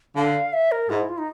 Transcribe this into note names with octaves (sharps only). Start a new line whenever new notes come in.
D3 F5
E5
A#4
G#2 E4
E4
F4
D#4